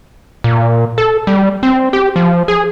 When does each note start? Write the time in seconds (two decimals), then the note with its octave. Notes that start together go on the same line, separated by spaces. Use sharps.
0.44 A#2
0.98 A4
1.27 G3
1.63 C4
1.93 G4
2.16 F3
2.48 G#4